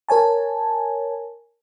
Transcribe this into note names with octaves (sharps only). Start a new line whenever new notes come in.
A#4 C#5 G#5 A5